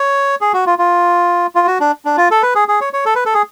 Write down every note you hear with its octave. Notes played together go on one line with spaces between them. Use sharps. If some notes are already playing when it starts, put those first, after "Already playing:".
Already playing: C#5
G#4
F#4
F4
F4
F4
F#4
D4
D4
F4
A4
B4
G#4
G#4
C#5
C#5
A4
B4
A4
G#4